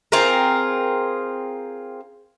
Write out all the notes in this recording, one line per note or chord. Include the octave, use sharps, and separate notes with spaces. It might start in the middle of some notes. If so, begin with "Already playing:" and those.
C4 F4 G#4 A#4